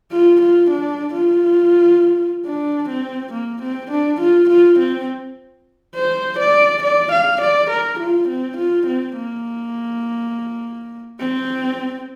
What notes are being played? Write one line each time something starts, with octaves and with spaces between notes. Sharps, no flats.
F4
F4
D4
F4
D4
C4
A#3
C4
D4
F4
F4
C4
C5
D5
D5
F5
D5
A#4
F4
C4
F4
C4
A#3
C4